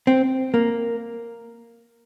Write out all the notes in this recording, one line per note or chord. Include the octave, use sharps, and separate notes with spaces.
C4
A#3